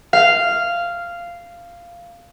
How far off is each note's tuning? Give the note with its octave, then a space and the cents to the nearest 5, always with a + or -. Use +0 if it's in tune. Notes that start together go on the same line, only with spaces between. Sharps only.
F5 -10